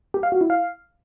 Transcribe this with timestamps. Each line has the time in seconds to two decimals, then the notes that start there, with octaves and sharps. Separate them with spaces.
0.14 G4
0.23 F5
0.32 F#4
0.41 E4
0.50 F5